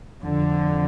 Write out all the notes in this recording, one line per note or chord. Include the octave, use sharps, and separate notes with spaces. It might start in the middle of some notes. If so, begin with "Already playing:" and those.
F2 D3 F3